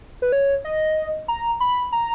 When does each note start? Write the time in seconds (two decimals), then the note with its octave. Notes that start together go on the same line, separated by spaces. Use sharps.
0.22 B4
0.32 C#5
0.65 D#5
1.28 A#5
1.60 B5
1.93 A#5